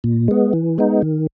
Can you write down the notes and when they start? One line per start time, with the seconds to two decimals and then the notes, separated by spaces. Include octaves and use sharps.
0.04 A#2
0.28 G#3 B3
0.53 E3
0.78 G#3 B3 D#4
1.02 D#3